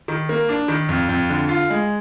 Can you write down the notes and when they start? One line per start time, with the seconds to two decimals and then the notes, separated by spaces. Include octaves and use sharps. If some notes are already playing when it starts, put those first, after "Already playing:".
0.08 D#3
0.29 A#3
0.49 D4
0.68 D#3
0.89 F2
1.09 F2
1.30 D3
1.49 F4
1.70 G#3